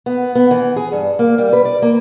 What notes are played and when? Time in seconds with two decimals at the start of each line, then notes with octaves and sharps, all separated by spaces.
0.06 B3
0.35 B3
0.51 E3
0.76 G#4
0.92 G2
1.19 A#3
1.38 G3
1.53 B4
1.65 D5
1.82 A#3